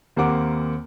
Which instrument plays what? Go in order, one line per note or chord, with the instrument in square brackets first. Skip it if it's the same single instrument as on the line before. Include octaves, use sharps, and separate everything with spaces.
[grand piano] D#2 A#3 C4 G4 F#5 D6